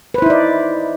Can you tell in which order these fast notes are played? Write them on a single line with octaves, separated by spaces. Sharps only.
B4 C5 E4 D#4 D5